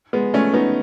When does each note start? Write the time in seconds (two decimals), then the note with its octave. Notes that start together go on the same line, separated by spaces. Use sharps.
0.13 G#3 B3
0.34 A3 C#4
0.54 B3 D#4